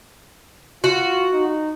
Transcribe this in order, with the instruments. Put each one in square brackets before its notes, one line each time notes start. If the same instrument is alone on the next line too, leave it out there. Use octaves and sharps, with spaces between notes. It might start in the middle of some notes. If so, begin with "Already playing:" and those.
[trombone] F4 [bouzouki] F#4
[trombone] D#4